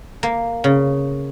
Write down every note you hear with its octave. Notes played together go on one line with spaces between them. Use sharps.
A#3
C#3